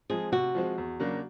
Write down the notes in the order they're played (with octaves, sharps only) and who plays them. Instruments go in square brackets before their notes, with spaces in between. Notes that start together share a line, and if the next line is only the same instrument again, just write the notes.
[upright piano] F3 G#3 C4 [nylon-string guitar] G#4
[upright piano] C3 [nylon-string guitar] F#4
[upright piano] F3 G#3 C4
E2
C#3 F#3 A#3 D4